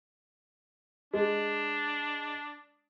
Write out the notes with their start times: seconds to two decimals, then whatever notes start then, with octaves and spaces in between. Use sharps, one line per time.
1.13 G#3 D4